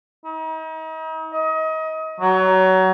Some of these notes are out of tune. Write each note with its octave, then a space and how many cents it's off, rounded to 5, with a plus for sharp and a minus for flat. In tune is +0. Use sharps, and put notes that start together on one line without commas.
D#4 +40
D#5 +30
F#3 +25